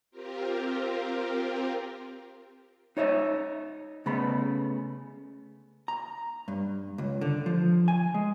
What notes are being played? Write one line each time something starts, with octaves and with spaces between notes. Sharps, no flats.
C4 F4 G4 A#4
D#4 C#5 D#5 E5
C#3 A3 B3 B5
A#5
G2
C#2
D3
F3
G#5
G#3